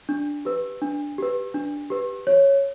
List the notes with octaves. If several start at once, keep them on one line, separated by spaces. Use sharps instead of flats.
D4
G4 B4
D4
G4 B4
D4
G4 B4
C#5